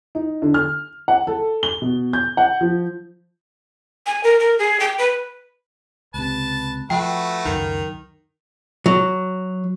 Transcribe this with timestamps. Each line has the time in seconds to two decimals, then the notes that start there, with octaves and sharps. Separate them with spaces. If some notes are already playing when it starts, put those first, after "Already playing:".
0.15 D#4
0.42 D3
0.54 F6
1.08 F#5
1.27 A4
1.63 G7
1.82 B2
2.13 G6
2.37 F#5
2.61 F3
4.06 G#5
4.24 A#4
4.40 A#4
4.59 G#4
4.80 G5
4.98 B4
6.14 C#2 C3 B4 A5
6.90 F3 A3 F#4 B4 G5
7.45 C#2 F#2 D#3
8.86 F#3